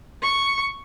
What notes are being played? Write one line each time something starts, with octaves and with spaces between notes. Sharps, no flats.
C#6